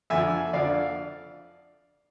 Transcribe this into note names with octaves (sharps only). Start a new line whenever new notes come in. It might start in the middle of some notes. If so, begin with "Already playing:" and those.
F2 D3 F3 E5 G#5
F2 D3 F3 D5 F5